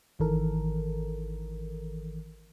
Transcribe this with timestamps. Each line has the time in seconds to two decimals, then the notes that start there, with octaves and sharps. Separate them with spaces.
0.19 G#1 D#3 E3 A4 A#4